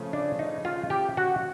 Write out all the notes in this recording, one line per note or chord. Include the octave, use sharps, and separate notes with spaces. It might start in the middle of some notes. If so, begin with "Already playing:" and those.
Already playing: C#3 F3 A3 C#4
D4
D#4
F4
G4
F#4